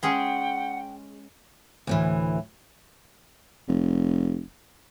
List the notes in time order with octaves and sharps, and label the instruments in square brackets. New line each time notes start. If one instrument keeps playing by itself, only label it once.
[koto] G#3 C#4 G#4 [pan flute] F#5 [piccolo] G5
[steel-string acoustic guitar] D2 A2 E3
[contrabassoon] F1